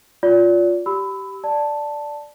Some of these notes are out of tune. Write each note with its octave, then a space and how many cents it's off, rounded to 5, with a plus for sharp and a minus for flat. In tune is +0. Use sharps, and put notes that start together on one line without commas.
F4 +10 D5 -30
G4 -20 B5 +20 E6 -15
D5 +0 A5 +0